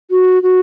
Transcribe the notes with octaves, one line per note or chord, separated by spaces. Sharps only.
F#4
F#4